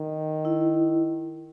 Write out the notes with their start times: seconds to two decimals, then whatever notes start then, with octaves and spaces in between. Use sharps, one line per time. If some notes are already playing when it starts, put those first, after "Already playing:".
Already playing: D#3
0.45 E4